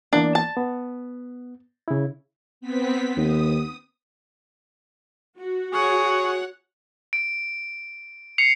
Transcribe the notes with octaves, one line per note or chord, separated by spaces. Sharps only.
E3 A#3 B3 D4
A5
B3
C#3 E4
B3 C4 B6
D#2 D#6
F#4
G#4 C#5 F#5 C#6
D7
C7 C#7 F7